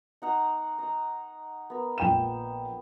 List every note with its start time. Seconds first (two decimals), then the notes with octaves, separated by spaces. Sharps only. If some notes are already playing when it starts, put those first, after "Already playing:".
0.22 D#4 F#5 A#5
0.79 D#5 A#5
1.70 B3 A#4
1.98 A#1 G5 E7